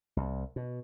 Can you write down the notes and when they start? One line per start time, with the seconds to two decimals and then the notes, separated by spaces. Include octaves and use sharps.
0.17 C2
0.56 B2